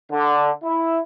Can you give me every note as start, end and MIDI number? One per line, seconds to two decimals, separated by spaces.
0.12 0.50 50
0.63 0.98 64